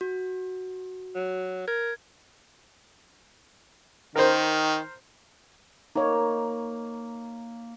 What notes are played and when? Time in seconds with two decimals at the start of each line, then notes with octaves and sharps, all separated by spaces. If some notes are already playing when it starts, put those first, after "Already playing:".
0.01 F#4
1.15 F#3
1.68 A#4 G#6
4.16 D#3 A#4 C5
5.96 A#3 D#4 C#5